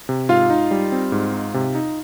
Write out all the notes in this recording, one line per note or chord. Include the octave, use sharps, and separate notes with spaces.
C3
G#2 F4 F5
D#4
G3
C4
G#2
D#4
C3
D#4